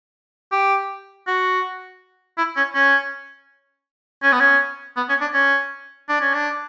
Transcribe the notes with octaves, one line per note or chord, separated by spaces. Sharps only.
G4
F#4
E4
C#4
C#4
C#4
B3
C#4
B3
C#4
D4
C#4
D4
C#4
D4